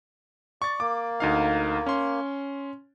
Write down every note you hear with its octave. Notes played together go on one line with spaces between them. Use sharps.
D5 C#6 A6
A#3 D6
D2 D#4 F5
C#4 C6